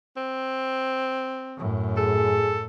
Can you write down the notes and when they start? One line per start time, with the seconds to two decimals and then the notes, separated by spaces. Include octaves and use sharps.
0.17 C4
1.57 F#2 A2
1.97 G#4 A4